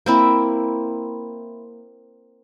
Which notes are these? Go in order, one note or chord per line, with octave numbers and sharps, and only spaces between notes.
A#3 C4 E4